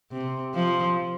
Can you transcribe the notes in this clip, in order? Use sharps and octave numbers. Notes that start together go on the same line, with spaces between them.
C3
F3